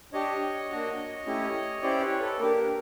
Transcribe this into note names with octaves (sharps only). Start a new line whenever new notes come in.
D4 G4 C#5 D#5
A#3 D4 F#4
A3 C#4 E4 G4
C#4 E4 G4 C5 D5
B4 C#5
A4 B4
B4
A#3 D4 G4 A#4